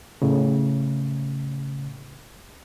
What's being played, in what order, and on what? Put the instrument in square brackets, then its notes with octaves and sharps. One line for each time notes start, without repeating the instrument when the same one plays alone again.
[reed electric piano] A2 C#3